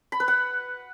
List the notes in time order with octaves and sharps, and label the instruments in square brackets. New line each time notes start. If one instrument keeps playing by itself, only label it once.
[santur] B5
B4
F#5